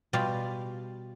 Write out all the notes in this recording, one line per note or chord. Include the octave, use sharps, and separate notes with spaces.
B2 G3 F4 G4 D5 F5